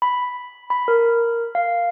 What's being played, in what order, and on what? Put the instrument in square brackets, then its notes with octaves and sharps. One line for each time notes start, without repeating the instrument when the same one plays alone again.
[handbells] B5
B5
A#4
F5